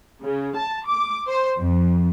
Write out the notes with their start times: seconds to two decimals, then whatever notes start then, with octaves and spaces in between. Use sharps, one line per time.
0.21 C#3
0.56 A5
0.86 D6
1.28 C5
1.59 F2